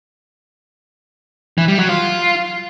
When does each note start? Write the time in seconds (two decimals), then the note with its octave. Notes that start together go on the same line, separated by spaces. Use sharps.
1.58 E3
1.68 G3
1.78 F#3
1.89 F4